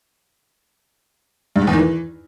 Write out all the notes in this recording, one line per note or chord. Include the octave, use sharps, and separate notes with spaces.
G2
G#2
E2
D#3
E3